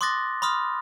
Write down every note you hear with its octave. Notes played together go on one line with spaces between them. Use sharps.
C6 D6 D#6 F#6 A6 A#6
B5 C6 D#6 F6